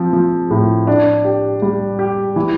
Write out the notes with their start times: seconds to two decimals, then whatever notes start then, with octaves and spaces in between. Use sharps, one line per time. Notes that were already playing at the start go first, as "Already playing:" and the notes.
Already playing: F3 C4
0.13 F3
0.50 A2
0.87 D4
1.25 G4
1.62 G3
1.99 G4
2.36 E3